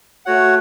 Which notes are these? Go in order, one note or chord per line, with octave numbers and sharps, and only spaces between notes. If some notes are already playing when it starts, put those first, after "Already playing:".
A3 F#4 C#5 F#5